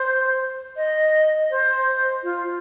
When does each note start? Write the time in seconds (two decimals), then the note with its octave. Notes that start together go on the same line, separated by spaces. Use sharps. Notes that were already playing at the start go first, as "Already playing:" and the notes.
Already playing: C5
0.77 D#5
1.51 C5
2.23 F4